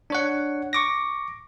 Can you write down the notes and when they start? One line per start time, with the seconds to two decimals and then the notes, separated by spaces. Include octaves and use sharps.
0.10 D4 C#5 F#5
0.73 C#6 D6 A#6